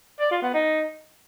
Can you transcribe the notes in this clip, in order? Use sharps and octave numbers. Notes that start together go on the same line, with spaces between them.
D5
F4
B3
D#4